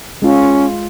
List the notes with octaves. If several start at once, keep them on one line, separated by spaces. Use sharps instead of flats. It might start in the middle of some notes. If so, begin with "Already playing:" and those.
G#3 C#4 F4